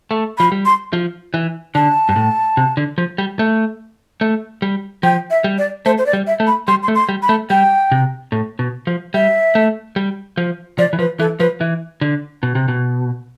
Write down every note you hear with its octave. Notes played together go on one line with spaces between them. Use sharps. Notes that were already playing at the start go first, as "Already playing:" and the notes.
A3
F3 B5
G3
C6
F3
E3
D3 A5
G2
A2
C3
D3
F3
G3
A3
A3
G3
F3 G5
E5
G3
D5
A3 C5
C5
D5
G3
E5
A3
B5
G3 C6
C6
A3
C6
G3
B5
A3
G3 G5
C3
A2
B2
F3
G3 E5
A3
G3
F3
F3 D5
E3
F3 B4
E3 A4
F3 B4
E3
D3
B2
C3
B2